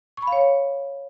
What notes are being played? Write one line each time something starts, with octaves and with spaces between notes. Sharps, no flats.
C#6
B5
F5
C#5